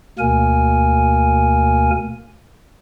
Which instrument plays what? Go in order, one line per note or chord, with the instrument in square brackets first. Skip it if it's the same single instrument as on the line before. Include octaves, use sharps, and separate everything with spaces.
[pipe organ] D2 B2 A#3 A#4 G#5